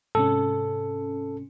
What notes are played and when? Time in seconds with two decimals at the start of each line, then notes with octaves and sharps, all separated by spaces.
0.15 G#2 C3 C#4 A4